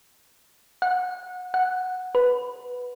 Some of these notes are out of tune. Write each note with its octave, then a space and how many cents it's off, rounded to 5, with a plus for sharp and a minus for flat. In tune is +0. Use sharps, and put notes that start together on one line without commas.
F#5 -25
F#5 -10
B4 -5